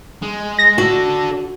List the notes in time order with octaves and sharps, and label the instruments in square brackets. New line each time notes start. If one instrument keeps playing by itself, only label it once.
[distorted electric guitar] G#3
[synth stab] A#6
[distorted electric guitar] D4 A4 [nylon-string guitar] F#4